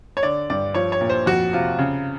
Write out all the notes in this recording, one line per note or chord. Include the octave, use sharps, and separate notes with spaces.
C#5
D3 D5
G2 D5
F3 C#5
C#5
A#2
C5
F2 F#4
C3 F4
C#3